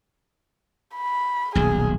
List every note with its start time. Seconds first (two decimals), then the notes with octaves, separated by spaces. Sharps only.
0.96 B5
1.55 D#1 B1 G#4